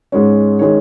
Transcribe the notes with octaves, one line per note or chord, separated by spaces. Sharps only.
G#2 G#3 C#4
D#3 G#3 C#4 C#5